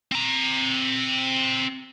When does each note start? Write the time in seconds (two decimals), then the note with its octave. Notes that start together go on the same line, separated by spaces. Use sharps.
0.12 C4 A#5